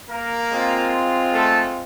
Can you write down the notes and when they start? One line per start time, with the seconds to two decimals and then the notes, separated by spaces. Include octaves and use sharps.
0.10 A#3 A#4
0.51 G#3 C4 F4
1.33 A3 A4